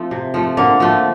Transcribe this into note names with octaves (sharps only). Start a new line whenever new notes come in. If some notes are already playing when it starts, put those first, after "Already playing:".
Already playing: F3 A3 C4
C3
F3 A3
D3 A#3
F3 A3